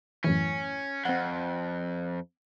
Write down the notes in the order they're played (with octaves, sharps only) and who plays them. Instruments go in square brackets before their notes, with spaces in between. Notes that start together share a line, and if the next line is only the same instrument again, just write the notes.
[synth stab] F#2 A2 E3 [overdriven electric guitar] C#4
[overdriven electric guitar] F2 [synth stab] C4 F#5